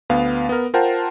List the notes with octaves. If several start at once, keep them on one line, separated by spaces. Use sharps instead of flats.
D2 B3 F5
B3 A#4
F4 A#4 C5 F#5 G5 A5